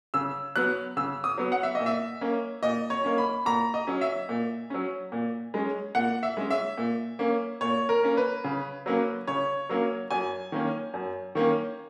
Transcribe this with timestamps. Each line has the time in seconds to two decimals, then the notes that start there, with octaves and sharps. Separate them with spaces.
0.14 C#3 E6
0.56 F#3 B3 F#6
0.97 C#3 E6
1.24 D#6
1.38 F#3 B3
1.52 F#5
1.63 E5
1.75 D#5
1.80 A#2
1.86 E5
2.21 A#3 C#4
2.63 A#2 D#5
2.90 C#5
3.04 A#3 C#4
3.18 B5
3.45 A#2 A#5
3.74 D#5
3.87 F#3 C#4
4.01 E5
4.29 A#2
4.70 F#3 C#4
5.12 A#2
5.54 G#3 C#4
5.95 A#2 F#5
6.23 E5
6.37 G#3 C#4
6.51 E5
6.78 A#2
7.19 A#3 C#4
7.61 A#2 C#5
7.89 A#4
8.03 A#3 C#4
8.17 B4
8.44 C#3
8.86 F#3 A#3 C#4
9.27 C#3 C#5
9.70 F#3 A#3 C#4
10.11 F#2 G#5
10.52 D#3 A#3 C#4
10.94 F#2
11.35 D#3 A#3 C#4